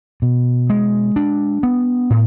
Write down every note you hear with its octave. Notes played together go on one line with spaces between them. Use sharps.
B2
G#3
D4
B3
A2